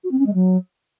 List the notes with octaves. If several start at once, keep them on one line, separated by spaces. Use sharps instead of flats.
F#4
C4
C#4
G#3
F#3